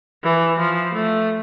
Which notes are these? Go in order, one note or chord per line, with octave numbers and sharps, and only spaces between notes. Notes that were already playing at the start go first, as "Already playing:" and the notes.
E3
F3
A3